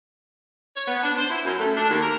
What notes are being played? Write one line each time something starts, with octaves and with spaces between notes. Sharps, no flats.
C#5
B3
D4
C5
E4
F#2
A3
D4
D#2
A#4